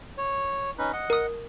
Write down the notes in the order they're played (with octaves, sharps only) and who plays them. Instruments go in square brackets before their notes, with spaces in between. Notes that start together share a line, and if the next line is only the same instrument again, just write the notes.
[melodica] C#5
C#4 D#4 B4
D#5 F#5
[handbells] A#4 D#6